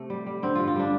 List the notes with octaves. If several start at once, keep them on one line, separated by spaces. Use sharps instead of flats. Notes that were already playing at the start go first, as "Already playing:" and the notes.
Already playing: C3 A3
G3
G3
D3 C4
G2 F4
F4
G3 D4